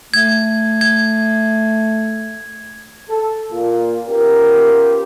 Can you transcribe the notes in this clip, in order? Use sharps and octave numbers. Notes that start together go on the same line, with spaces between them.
A3 G#6
G#6
A4
A#2 A#3 F4
B3 C#4 F4 G4 A#4